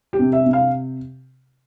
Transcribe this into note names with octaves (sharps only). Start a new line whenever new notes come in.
G4
C3
E5
C3
F5